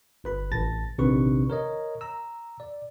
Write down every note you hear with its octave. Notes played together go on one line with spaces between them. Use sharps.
G1 B4 B5
A1 A5 A6 A#6
A#1 C3 D#3 D4 B4 C#6
A#4 C#5 D#5
A#5 E6
D5